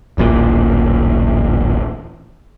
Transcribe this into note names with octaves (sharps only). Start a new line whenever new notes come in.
D1 A1 A#2